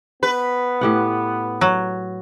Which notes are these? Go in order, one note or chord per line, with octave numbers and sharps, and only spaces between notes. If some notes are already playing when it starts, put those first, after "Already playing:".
B3 B4
A2 G4 F#5
F#3